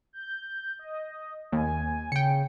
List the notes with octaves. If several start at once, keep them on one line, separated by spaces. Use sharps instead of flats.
G6
D#5
D#2 G#5
C#3 G5 C#7